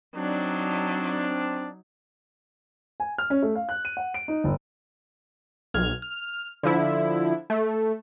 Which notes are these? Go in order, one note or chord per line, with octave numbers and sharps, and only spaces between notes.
F#3 C4 D4 D#4
G#5
F6
C#4
A3
F5
F#6
D#7
F#5
D7
D#4
G1
B1 F6 G#6
F6
D3 F3 E4
A3